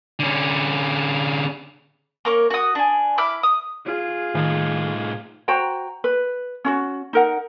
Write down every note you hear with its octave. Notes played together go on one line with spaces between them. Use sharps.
D3 C#4
A#3 A#4 C#5
F#4 D#6
D4 G#5
E4 B5 D6 F6
D#6
F4 G#4
A2 D#3 D#4
F#4 C5 G5 A#5
B4
C#4 F4 F#4
D#4 A#4 F#5